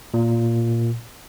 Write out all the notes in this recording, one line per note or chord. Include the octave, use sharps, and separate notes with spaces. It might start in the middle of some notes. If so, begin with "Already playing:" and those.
A#2